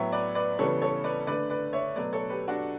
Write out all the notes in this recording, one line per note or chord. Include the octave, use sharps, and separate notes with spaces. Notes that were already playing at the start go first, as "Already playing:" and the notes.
Already playing: A2 F#3 B3 C#5 E5
B4 D5
B4 D5
C#3 E3 G3 B3 A4 C#5
A4 C#5
B4 D5
D3 A3 B4 D5
B4 D5
C#5 E5
B2 F#3 A3 B4 D5
A4 C#5
G4 B4
D4 F#4